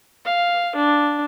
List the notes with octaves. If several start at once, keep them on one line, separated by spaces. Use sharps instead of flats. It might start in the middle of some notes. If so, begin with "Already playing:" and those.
F5
D4